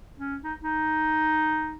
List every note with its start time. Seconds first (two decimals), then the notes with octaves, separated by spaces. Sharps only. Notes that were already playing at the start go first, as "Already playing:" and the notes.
0.17 C#4
0.44 D#4
0.62 D#4